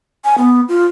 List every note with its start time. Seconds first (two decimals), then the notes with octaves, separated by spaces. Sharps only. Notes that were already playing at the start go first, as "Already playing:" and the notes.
0.24 G#5
0.38 B3
0.69 F4